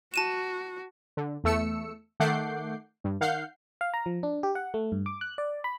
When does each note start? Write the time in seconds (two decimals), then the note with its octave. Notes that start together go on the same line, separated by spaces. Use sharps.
0.14 F#4 A5 D#7 E7
1.17 D3
1.44 E2 A3 E6 C#7
2.20 D#3 A3 F#5 D6 G6 C7
3.04 G2
3.21 D#3 F5 F#5 G6 C7
3.81 F5
3.94 A#5
4.06 F3
4.23 D4
4.43 G4
4.55 F#5
4.74 A3
4.92 G2
5.06 D6
5.21 F#6
5.38 D5
5.64 B5